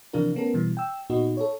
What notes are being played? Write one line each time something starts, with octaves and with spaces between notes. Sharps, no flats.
C3 E3 F3 D4 F4 A#4
A3 B3 C#4 A4 A#4
B2 E3 G3
G5 E6
A#2 B3 D#4 F#4
A4 C#5